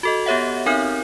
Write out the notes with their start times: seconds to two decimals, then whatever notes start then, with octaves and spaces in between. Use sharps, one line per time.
0.03 F#4 A4 D#5
0.26 B3 G4 C#5 E5 F#5
0.66 C4 D#4 A#4 F6 G6